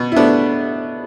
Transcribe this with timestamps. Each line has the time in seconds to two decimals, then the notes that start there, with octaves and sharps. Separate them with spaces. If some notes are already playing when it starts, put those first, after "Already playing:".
Already playing: B2
0.12 E4
0.16 A3 B3 D4